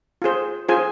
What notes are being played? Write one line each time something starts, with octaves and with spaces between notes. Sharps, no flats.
F4 G#4 C5
F4 G#4 C5 G#5